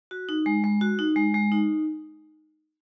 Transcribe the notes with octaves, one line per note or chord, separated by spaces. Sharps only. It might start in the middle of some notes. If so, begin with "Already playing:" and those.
F#4
D#4
G#3
G#3
F#4
D#4
G#3
G#3
D#4